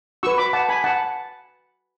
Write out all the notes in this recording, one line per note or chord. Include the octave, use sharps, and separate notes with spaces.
F#4 B4 C#6 E6
B5 D6
F#5 A5
G#5 B5
F#5 A5